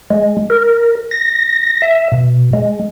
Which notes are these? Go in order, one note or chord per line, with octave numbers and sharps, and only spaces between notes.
G#3
A#4
A#6
E5
B2
G#3